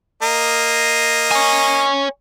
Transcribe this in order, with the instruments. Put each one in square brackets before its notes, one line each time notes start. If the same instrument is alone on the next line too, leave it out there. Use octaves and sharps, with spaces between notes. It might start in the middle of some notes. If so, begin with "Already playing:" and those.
[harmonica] A#3 D#5
[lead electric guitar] C#5 G#5